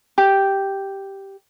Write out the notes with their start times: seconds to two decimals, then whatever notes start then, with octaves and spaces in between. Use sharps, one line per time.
0.18 G4